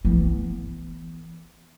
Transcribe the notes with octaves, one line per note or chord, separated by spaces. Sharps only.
E3 B3